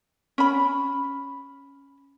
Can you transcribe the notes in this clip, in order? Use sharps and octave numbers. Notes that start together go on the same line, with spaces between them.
C#4 B5